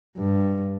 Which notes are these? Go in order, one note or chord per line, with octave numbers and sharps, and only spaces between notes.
G2